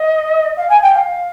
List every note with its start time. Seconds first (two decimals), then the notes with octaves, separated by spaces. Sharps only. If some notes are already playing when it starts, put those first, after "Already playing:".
Already playing: D#5
0.57 F5
0.69 G#5
0.82 G5
0.94 F5